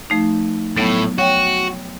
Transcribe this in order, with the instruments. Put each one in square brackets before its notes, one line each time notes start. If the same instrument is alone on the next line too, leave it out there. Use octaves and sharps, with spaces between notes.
[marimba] F3 A3 D#4
[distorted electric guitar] A2 [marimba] F#3 B3
[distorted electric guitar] F#4 [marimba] C#5 G5